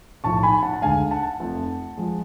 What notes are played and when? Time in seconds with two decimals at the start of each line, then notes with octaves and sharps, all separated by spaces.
0.24 B1 A2 F3 A5 C#6
0.43 G#5 B5
0.63 F#5 A5
0.73 A5
0.82 D2 D3 G#3 F5 G#5
1.11 F#5 A5
1.40 F1 F2 F3 A3
1.97 F3 G#3